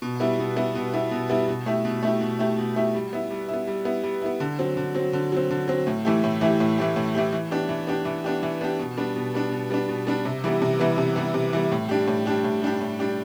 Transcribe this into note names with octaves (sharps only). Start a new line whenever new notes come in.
B2
G3 B3 E4
B2
G3 B3 E4
B2
G3 B3 E4
B2
G3 B3 E4
B2
A3 E4 G4
B2
A3 E4 G4
B2
A3 E4 G4
B2
A3 E4 G4
G3
B3 E4
G3
E4
B3
G3
B3 E4
G3
B3 E4
D3
F#3 C4
D3
F#3 C4
D3
F#3 C4
D3
F#3 C4
A2
E3 A3 E4 G4
A2
E3 A3 E4 G4
A2
E3 A3 E4 G4
A2
E3 A3 E4 G4
E3
B3 D4 G4
E3
B3 D4 G4
E3
B3 D4 G4
E3
B3 D4 G4
B2
G3 B3 D4
B2
G3 B3 D4
B2
G3 B3 D4
B2
G3 B3 D4
C3
E3 G3 B3
C3
E3 G3 B3
C3
E3 G3 B3
C3
E3 G3 B3
A2
G3 D4 G4
A2
G3 D4 G4
A2
G3 D4 G4
A2
G3 D4 G4